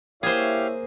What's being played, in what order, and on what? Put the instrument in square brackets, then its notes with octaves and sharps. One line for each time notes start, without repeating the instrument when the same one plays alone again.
[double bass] A#3 [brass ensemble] E4 C#5 E5 [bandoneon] G4 F5 [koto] G#4 C5